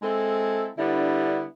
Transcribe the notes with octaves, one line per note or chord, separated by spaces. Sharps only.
G#3 C4 E4 A4
D3 G3 B3 D4 E4